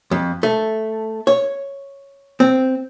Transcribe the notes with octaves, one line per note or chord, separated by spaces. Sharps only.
F2
A3
C#5
C4